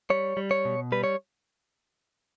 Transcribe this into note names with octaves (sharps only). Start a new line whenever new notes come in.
G3 C#5
G3
C#5
B2
G3 B4
C#5